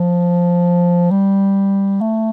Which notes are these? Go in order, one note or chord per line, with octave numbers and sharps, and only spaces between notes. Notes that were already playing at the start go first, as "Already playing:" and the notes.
Already playing: F3
G3
A3